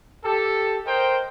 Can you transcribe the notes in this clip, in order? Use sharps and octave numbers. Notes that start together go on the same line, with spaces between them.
G4 A4
A#4 C5 D#5 G5